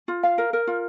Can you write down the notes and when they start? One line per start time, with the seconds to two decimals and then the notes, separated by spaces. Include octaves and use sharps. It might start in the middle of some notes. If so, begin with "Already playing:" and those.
0.08 F4
0.23 F5
0.38 A#4
0.53 A#4
0.67 F4